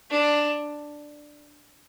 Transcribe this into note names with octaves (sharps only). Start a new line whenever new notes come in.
D4